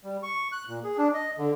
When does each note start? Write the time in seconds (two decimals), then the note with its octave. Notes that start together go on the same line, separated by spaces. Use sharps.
0.04 G3
0.23 C#6
0.52 F#6
0.68 A#2
0.84 G#4
0.98 D4
1.14 D#5
1.38 D3